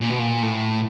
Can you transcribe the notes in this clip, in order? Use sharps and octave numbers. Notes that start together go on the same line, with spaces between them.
A#2
B2
A#2
A2